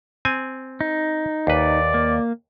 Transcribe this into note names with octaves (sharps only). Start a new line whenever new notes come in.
C4 G#5
D#4
D#2 B4 D5
A#3